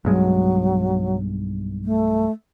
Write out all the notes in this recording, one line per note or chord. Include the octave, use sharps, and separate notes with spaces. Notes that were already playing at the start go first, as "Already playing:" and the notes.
B1 G2 F#3 G#3
A3